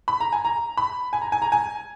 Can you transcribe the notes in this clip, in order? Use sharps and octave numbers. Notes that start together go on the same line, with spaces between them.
B5
A#5
G#5
A#5
B5
G#5
A#5
G#5
A#5
G#5